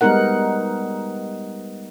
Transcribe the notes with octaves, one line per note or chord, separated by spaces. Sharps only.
G3 G#3 B3 D#4 A#4 F#5